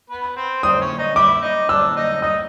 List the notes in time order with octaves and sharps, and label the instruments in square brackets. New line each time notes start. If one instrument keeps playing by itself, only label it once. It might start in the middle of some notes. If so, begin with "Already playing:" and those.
[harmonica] B3 B4
C4 C5
[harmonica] C4 C5 [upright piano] D#6
[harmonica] C#4 C#5
D#4 D#5
[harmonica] E4 E5 [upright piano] D6
[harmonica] D#4 D#5
[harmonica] D4 D5 [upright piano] E6
[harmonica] D#4 D#5
[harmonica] D#4 D#5 [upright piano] D#6